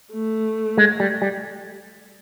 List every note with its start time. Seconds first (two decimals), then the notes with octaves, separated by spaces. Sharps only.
0.13 A3
0.77 G#3
1.00 G3
1.22 G3